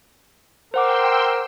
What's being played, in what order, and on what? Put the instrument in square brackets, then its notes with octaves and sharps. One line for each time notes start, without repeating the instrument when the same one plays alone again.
[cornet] A#4 [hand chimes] C5 F#5 D6 [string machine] G5 C6 E6